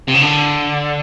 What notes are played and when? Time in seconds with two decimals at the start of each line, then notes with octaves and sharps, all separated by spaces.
0.08 C3
0.14 C#3
0.22 D3